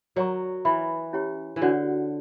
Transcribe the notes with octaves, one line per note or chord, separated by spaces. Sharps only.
F#3 A#4 D5 A#5 C#6
E3 B4 E5 B5
C#4 E4 G4 C#5 G5
E3
D3 F#4 C#5 F#5